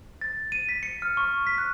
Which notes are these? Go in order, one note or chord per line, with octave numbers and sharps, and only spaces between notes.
A6
D#7
B6
C#7
F6
C#6
B6
F#6